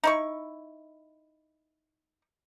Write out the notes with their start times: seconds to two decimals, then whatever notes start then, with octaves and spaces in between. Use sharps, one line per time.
0.04 D#4 E4 C#6